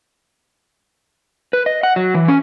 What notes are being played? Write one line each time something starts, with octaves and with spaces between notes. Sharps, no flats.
B4
D#5
F#5
F#3
E3
C#4